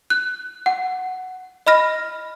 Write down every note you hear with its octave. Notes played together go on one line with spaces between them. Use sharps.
F#6
F#5
D#5 B5 F6 A#6